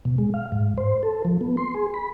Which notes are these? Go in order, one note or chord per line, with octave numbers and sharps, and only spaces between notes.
B2
G#3
F5
G#2
C5
A4
F3
B3
C6
G#4
B5